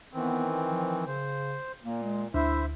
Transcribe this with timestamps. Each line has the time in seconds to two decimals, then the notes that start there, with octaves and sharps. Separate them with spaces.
0.13 D#3 E3 B3 C4
0.65 F3
1.07 C#3 C5
1.83 A#2 A#3
2.03 G#3
2.34 D2 E4 C5 E5